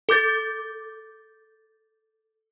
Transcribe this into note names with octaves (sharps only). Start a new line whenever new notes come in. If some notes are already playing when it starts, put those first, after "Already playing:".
A4 D6 G6 A6